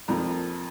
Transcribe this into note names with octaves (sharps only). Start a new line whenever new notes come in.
F2 F3 A#3 A#5